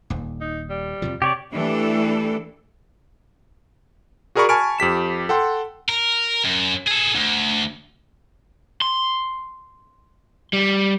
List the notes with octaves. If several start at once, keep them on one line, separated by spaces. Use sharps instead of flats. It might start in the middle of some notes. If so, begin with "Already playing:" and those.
D#1 D#2
D#4
G3
F2 C3 F3
C3 G4 C#5 D5
E3 A3 D4 E4 G4 A4
F#4 G#4 A#4 D5 B5 C#6
G#5 A5 B5 C#6 F6 D7
F2 G4 B6 E7
A4 F#5 G5 C6
A#4
F#2
G#4 A4
D2
C6
G3